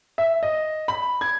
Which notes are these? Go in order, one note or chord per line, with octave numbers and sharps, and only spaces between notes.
E5
D#5
B5
G#6